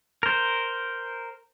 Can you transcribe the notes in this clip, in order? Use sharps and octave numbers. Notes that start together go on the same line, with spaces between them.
A#4 C5